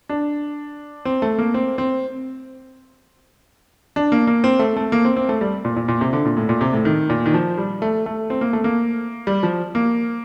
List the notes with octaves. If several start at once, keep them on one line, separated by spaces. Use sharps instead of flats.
D4
C4
A3
A#3
C4
C4
D4
A#3
A#3
C4
A3
A3
A#3
C4
C4
A3
G3
A#2
A#2
A#2
C3
D3
A#2
A2
A#2
C3
A2
D#3
A#2
D#3
F3
G3
A3
A3
C4
A#3
A3
A#3
G3
F3
A#3